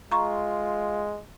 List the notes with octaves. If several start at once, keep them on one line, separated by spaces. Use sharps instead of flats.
G#3 F4 A#5 C#6